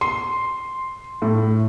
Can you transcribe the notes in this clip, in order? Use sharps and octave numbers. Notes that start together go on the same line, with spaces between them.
C6
A2